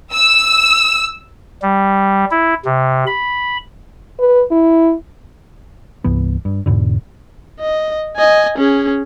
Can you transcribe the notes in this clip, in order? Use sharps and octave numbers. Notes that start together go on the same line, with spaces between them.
E6
G3
E4
C3
B5
B4
E4
C2 G2 E3 B3
G2
E2 G#2 B2 D3
D#5
D#5 G#5
C#4 G#4